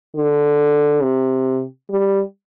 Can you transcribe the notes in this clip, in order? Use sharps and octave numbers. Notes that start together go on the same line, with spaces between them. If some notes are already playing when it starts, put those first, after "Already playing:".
D3
C3
G3